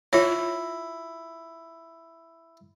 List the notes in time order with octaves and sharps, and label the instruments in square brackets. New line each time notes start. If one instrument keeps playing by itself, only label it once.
[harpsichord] E4 [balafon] F4 C#5